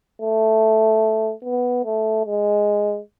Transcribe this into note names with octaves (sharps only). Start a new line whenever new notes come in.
A3
B3
A3
G#3